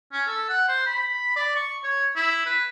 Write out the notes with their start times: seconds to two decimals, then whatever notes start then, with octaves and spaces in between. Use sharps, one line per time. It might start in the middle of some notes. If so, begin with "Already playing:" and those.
0.12 C#4
0.27 A4
0.49 F#5
0.68 C5
0.87 B5
1.36 D5
1.56 C#6
1.84 C#5
2.16 E4
2.45 B4